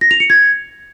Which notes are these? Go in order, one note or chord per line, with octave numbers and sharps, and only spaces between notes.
A#6
F7
C#7
G#6